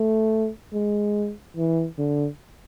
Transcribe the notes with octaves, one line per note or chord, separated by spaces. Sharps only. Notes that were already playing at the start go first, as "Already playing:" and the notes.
Already playing: A3
G#3
E3
D3